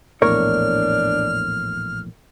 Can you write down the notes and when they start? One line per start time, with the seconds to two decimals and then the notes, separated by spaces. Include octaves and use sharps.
0.22 A#1 E2 A2 D4 A#4 C#5 F6